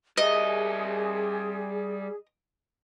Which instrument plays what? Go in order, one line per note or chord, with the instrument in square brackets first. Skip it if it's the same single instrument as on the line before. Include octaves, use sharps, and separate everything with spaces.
[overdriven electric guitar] G3 E5 [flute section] G#4 [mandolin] D#5